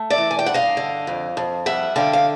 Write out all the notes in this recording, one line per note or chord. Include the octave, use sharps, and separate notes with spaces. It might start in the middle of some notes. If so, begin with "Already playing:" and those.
Already playing: A3
D5 E5
E3
G#5
G5
G2 F#5
D#5 F5
D3
F2
F2
G3 E5 F#5
D3 F5 G5
F5